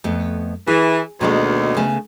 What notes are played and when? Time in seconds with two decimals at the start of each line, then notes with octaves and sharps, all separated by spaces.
0.04 F2 A3 B3
0.67 E3 G#4
1.21 D2 B2 D#3 G#3 A#3
1.77 C#3 A3 B3